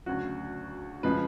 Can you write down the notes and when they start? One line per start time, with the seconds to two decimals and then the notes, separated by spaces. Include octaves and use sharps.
0.06 D2 C#3 F#3 F#4
1.03 C#3 F3 G#3 B4